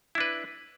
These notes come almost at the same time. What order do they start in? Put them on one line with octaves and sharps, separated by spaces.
E4 D4 B4